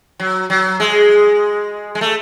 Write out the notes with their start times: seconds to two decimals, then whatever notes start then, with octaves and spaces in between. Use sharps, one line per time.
0.20 F#3
0.50 F#3
0.80 G#3
1.95 G#3
2.01 A3